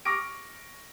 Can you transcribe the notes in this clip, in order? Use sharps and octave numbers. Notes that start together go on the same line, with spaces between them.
C#6 D6 F6 A#6 D7